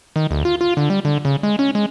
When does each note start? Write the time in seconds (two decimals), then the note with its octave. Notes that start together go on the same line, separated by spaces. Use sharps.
0.16 D#3
0.31 D2
0.45 F4
0.61 F4
0.77 D3
0.90 G3
1.05 D3
1.25 C#3
1.43 G#3
1.59 C#4
1.75 G#3